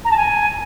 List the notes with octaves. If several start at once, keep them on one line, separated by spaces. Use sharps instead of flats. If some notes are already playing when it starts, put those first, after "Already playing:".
A#5
A5
G#5